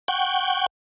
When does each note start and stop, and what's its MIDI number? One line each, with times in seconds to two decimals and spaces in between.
0.08 0.66 78
0.08 0.66 79
0.08 0.66 85